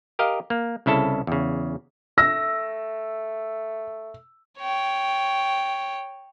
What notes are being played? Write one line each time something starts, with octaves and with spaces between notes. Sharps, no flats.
G4 A#4 D#5 F5
A#3
C2 C#3 E4 A4 A5
E2 C#3
A3 E6 A#6
C#5 G5